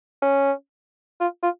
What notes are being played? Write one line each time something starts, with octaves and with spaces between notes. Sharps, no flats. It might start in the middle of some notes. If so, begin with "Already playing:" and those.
C#4
F4
F4